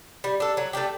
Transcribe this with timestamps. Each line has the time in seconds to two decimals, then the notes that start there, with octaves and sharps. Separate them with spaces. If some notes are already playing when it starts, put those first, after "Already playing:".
0.24 G3
0.40 D4 A4
0.57 F#3
0.73 A3 D4 G4